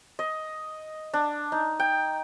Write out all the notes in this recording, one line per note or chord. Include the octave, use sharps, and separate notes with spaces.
D#5
D4
D#4
G5